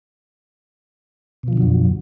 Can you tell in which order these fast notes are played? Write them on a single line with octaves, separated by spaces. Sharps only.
B2 F3 D3 F#3 F#2